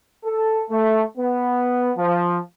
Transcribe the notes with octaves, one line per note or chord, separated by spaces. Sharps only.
A4
A3
B3
F3